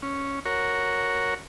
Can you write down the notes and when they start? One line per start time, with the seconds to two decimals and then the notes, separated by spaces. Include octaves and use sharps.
0.03 C#4
0.46 F#4 A#4 C#5